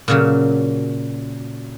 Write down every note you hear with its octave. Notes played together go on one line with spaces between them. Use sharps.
A#2 C#3 F#3